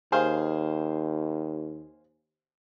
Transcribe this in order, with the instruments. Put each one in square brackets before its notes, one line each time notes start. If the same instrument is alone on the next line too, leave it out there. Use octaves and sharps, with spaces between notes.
[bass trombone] D#2 [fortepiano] G#4 C5 F5